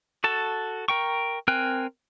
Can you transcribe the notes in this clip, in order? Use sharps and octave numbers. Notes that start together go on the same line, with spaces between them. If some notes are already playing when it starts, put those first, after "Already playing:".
F#4 A4 A5
A#4 G5 C#6
C4 A#4 G5 G#5 F#6